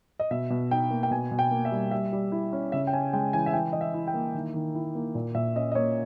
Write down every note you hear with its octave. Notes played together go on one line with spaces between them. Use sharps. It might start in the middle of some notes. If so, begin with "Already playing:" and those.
D#5
B2 E5
B2
D#4 G5
A#3
G5
B2 G#5
B2
G5
A#3
E5
G3
G3 E5
G3
E4
C#4
C#3 E5
G5
C#4 G#5
G#3 G5
E3 G#5
E5
E3 G5
E3 D#5
E5
E4
G5
A#3
D#3
D#3
E4
A#3
A#2
A#2 E5
C#4 D#5
D#5
A#3 C#5